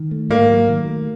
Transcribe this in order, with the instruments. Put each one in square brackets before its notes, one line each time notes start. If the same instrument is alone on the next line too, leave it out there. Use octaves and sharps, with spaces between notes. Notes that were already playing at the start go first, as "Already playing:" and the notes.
Already playing: [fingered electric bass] D#3
A3
[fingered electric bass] G#2 [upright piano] A#3
[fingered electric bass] F#3
D#3
A3